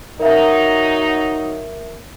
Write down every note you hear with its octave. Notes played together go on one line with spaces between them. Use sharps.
F#3 D#4 A#4 E5